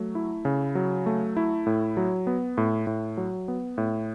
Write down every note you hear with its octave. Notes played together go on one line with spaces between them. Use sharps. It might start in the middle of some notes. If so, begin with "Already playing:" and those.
Already playing: F#3 A3
E4
C#3
F#3
A3
E4
A2
F#3
B3
A2
A2
F#3
B3
A2